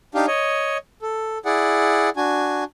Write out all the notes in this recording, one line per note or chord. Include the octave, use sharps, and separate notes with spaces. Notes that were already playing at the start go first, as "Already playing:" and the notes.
D4 D#4 G4 F5
C#5 D#5
A4
E4 G#4 D5 F#5
D4 F#4 G#5